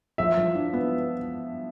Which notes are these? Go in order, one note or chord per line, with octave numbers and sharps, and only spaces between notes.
F3 E5
F3
D4
B3